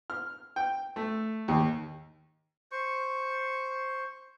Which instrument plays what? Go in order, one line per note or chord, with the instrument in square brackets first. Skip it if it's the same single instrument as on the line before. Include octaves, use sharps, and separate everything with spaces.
[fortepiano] F6
G5
A3
D#2
[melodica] C5 C#6